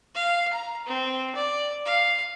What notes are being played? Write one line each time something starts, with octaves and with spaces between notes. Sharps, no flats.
F5
A#5
C4
D5
F5